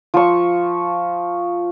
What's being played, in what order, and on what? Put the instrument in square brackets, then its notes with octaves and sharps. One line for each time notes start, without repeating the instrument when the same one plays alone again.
[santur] F3 C#6